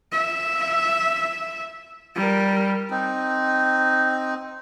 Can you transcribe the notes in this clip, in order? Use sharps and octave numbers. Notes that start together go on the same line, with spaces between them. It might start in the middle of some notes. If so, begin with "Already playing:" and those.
E5
G3 A#4
C4 D#4